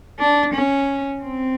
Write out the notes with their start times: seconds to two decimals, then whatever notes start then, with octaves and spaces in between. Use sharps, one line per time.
0.19 D4
0.53 C#4
1.23 C4